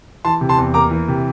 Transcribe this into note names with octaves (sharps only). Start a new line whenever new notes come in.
E3 A5 C6
C3
A5 C6
E2
A#3 A#5 D6
E3
C3